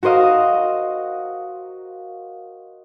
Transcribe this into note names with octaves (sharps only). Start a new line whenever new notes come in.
F#4 A#4 C5 D#5 F5